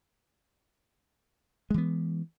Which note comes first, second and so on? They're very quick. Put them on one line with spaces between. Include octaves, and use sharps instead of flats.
G#3 E3 B3